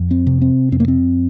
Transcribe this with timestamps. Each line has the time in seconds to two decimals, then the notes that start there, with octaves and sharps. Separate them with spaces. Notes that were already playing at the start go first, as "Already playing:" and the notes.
Already playing: F2
0.11 C4
0.27 C3
0.42 C4
0.72 F2 C4
0.80 A#3
0.88 C4